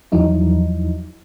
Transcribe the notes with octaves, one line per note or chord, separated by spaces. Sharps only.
E2 F3 F#3 D#4 E4